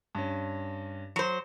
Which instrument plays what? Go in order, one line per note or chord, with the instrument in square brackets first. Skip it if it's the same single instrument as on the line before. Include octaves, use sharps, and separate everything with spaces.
[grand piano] G2 C#4
[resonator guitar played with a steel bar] F#3 C5